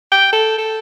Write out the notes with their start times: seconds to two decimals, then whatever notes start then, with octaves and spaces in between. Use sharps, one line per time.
0.12 G5
0.33 A4
0.58 A4